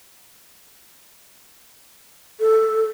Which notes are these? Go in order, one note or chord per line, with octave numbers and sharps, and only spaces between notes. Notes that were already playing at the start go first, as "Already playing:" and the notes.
A4